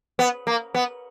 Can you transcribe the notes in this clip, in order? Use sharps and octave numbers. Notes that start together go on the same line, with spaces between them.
B3
A#3
B3